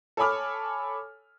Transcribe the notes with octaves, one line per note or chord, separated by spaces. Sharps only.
A4 C#5 G#5 B5 D6 F6